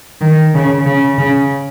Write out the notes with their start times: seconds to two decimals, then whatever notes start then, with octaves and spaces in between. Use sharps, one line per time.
0.21 D#3
0.54 C#3
0.86 C#3
1.18 C#3